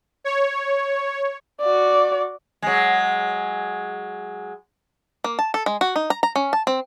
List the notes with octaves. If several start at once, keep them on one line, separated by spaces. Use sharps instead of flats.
C#5
F#4 D5
F#3 G#3
A#3
A5
A4
G#3
F#4
D#4
A#5
A#5
C#4
A5
C4